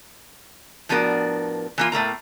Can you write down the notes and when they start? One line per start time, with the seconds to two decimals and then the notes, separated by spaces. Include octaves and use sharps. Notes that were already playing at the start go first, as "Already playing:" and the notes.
0.89 A2 F3 B3 D4 F#4 A#4
1.78 E3 A#3 F4
1.92 A2 A3 A#3 A#5